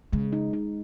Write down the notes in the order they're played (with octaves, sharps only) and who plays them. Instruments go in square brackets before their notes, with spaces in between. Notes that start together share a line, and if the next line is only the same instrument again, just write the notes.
[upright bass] C#3 [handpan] G#3
[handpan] D#4
D#4